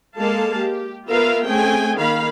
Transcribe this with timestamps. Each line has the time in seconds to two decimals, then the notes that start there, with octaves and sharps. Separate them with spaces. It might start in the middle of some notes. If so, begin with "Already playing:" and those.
0.17 G#3 A#3 A4 F5 A5
0.57 G4
1.07 B3 F4 A#4 B4 E5 F5
1.46 A3 C4 C#4 G#4 G5 G#5
1.96 D#3 A#3 F5 B5